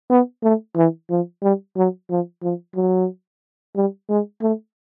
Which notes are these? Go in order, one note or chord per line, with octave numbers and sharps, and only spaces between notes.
B3
A3
E3
F3
G3
F#3
F3
F3
F#3
G3
G#3
A3